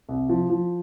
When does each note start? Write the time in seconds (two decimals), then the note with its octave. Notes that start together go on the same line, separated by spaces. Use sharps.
0.09 C2
0.29 F3
0.50 F3